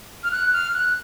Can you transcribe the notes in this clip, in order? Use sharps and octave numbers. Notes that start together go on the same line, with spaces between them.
F6
F#6
F6
F#6